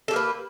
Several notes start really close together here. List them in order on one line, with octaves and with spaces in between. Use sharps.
A4 G4 A#3 B4